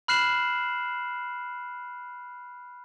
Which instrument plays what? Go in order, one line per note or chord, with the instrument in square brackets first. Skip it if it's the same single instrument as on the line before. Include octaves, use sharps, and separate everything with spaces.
[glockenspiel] B5 F6 F#6 C7 E7 F#7